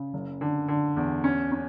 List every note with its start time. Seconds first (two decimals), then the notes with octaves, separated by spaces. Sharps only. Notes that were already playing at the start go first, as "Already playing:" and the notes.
Already playing: C#3
0.13 F#1
0.41 D3
0.68 D3
0.96 E2
1.24 C#4
1.52 C#4